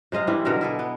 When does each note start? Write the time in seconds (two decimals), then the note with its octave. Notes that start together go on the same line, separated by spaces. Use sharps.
0.12 C3 G#3 D#5 F5
0.27 E3 G3 C4 E4
0.45 B2 D3 A4 A#4
0.61 E4 G#4 A4
0.79 B3